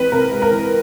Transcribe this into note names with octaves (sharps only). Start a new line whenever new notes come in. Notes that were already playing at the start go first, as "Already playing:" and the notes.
Already playing: E3 G#3 C4 B4
C3 A#4
G#3
A#4
E3